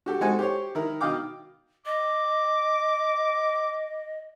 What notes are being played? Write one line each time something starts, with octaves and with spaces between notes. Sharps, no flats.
F#4 G4 A4
G#3 C4 D#4 F#4 A4 G#5
G4 C5 C#5
D#3 E4 A#4
B2 D#3 D#5 F5 G5 D6
D#5 D6